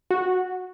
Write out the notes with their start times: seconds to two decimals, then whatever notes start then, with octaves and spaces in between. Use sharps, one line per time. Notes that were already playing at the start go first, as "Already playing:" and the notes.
0.11 F#4